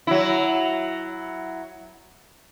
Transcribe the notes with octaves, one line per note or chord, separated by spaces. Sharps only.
F#3 E4